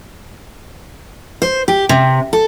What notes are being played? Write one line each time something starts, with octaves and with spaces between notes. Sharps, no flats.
C5
G4
C3
A4